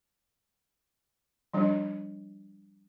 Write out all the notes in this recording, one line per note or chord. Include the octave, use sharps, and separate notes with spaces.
F3 G3 D4